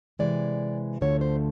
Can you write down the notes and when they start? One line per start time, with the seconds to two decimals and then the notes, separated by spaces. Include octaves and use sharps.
0.19 C3 E3 G#3 D5
1.01 D2 D3 F3 A3 C#5
1.21 C5